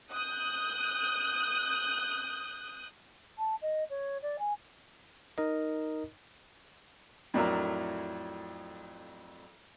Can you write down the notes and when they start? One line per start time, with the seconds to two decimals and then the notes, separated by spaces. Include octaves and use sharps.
0.12 D#6 F#6 G6
3.38 A5
3.62 D#5
3.90 C#5
4.22 D5
4.38 G#5
5.38 D#4 A#4 D#5
7.34 F2 A2 F#3 D4 E4 A#4